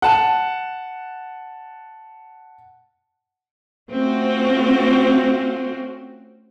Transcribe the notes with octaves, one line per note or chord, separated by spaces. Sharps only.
F#5 A5
A3 C4 C#4 F4 F#4